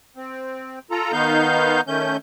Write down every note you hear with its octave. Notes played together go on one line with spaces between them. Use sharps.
C4
F4 A4 A#5
D#3 B3 D#4 F5 G6
D#3 A3 C#4 G6